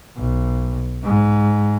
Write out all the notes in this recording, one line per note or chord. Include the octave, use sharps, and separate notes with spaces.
B1
G#2